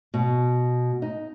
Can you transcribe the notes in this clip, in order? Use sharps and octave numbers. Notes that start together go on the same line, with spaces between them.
B2
D#4